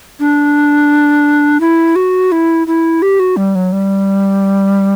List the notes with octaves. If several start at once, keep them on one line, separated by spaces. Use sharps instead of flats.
D4
E4
F#4
E4
E4
G4
F#4
G3
F#3
G3